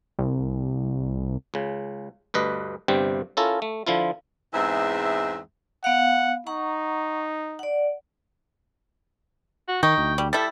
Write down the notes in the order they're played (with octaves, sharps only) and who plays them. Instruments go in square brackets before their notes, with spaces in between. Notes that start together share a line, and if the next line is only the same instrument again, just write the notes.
[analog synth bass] C2
[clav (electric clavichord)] C#2 C#3
D2 G2 B4 D#5
G1 G2 C3 G3 C4 G5
C#4 E4 F4 A4 A#4
A3
D3 F3 E4 F4
[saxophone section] E2 G#2 C4 E5
[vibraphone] B3 F5 [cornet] F#5
[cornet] D#4 [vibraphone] F#5 A#5 C#6
[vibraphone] D5 F#5
[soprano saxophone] F#4
[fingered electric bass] D#3 [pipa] D#4 [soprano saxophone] G5 [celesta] C#6
[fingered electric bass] D2
[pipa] G3
[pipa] G3 E4 [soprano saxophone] A4 [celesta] A6